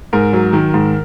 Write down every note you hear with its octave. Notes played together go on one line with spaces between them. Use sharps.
G#2 A#4
F#3
D#3
G#2